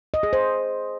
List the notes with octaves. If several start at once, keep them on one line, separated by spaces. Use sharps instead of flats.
D#5
G#4
C5